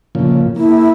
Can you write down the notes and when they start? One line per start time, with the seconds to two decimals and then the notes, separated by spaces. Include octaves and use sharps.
0.15 A#2 C#3 F3
0.56 A#3 E4